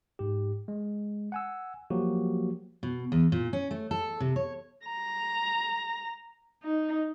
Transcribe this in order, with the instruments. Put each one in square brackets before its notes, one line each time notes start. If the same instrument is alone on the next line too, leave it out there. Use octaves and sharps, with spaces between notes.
[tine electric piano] G#2 G4
G#3
F#5 G#5 E6
F3 F#3 A#3 F#4 G4
[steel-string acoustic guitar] B2
E2
A#2
C#4
A3
A4
C3
C#5
[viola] A#5
D#4